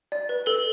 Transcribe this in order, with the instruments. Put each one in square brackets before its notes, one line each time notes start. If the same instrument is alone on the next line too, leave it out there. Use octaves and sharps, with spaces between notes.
[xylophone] D5
B4
A4 G7